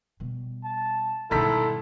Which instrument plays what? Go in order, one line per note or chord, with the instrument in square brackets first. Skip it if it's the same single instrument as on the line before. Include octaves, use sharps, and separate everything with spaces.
[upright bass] B2 G3
[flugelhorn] A5
[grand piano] G#2 D#3 B6 [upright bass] B2 G3 [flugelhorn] E4 [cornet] A4